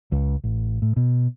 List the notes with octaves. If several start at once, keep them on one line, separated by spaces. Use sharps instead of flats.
C#2
A1
A2
B2